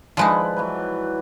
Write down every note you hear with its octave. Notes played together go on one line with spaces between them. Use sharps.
F3 G#3 D#4 E4 B4 D5
E3 F#3 B4